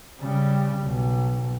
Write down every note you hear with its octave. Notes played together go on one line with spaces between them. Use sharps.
C#3 G3
B1